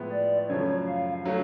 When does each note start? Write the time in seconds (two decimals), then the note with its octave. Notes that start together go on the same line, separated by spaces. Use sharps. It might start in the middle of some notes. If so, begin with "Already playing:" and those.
Already playing: A2 F3 G#3 B3 E4
0.12 D5
0.49 F#2 C#3 F3 A3 C#5
0.87 F5
1.25 D3 F#3 A3 C#4